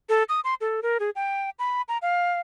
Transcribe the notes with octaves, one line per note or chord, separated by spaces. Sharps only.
A4
D#6
C6
A4
A#4
G#4
G5
B5
A#5
F5